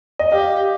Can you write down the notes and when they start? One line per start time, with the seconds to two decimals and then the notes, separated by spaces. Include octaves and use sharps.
0.19 D#5
0.32 G4 F5